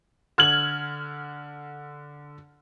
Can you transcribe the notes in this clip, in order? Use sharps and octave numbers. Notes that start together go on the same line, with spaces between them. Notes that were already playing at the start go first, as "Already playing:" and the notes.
D3 F6 G#6 F#7